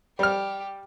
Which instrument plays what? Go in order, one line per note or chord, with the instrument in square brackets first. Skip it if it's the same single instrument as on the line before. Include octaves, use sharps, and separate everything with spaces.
[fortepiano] G3 F6 [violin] G4